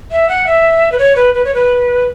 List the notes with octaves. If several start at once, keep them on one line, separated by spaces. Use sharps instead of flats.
E5
F#5
E5
B4
C#5
B4
B4
C#5
B4